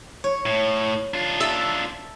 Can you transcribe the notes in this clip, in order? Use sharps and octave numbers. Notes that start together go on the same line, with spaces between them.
C#5
A2
D4 F4
A4 E5